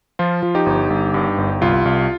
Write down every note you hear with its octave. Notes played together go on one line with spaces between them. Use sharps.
F3 F4
F3
D#4 G4
G1
G1
G2
G1
C2 F4
C2